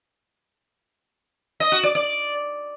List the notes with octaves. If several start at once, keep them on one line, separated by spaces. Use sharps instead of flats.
D#5
F#4
D5
D5